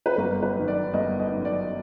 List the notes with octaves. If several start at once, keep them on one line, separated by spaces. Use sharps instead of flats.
B4
G1 A#4
B4
F#2 D#3
D5
G1 D#5
D#5
F#2 D#3
D5